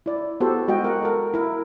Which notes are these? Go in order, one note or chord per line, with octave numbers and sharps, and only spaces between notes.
E4 D5
B3 F#4 G4 A4 C5
G#3 F#4 D#5 G5
A#4 F#5
A4 A#4
E4 A#4